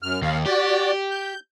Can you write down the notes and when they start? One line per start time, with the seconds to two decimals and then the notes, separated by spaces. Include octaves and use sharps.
0.02 F#2 F6
0.22 D#2 F5
0.46 F#4 G4 D5
1.11 G6